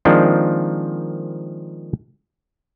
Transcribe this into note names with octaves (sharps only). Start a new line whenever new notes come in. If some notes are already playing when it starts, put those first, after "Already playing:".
D#3 F3 G#3 A#3 C4 D4